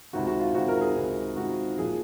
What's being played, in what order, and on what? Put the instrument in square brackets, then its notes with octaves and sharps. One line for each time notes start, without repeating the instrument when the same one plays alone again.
[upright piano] C#2 C3 D#3 F#4
F#4
F4
C#2 C3 D#3 F#4
A#4
G#4
C#2 C3 D#3
C#2 C3 D#3 F#4
A#1 A#2 F3 G#4